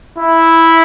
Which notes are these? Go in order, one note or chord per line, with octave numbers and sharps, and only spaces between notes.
E4